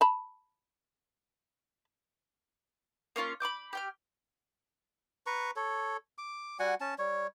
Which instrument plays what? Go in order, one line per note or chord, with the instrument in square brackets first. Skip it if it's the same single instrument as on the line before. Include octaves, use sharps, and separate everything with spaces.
[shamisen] A5 B5
[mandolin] A#3 C#4 F4 C#6
B5 C6 D6 G6
G4 G5 F6
[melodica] B4 A#5 C#6
A4 C#5
D6
G3 F#4 F#5 G#5
C#4 A5
G3 C#5